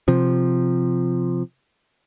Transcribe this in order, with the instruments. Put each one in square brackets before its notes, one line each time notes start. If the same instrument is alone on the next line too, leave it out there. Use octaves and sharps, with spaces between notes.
[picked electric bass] C3 F3